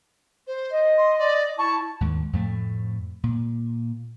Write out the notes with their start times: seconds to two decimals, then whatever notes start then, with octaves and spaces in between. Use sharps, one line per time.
0.47 C5
0.72 D#5
0.97 C6
1.18 D5
1.58 E4 A5 C#6
2.01 D#2 G#2
2.33 F2 A2 A3
3.24 A#2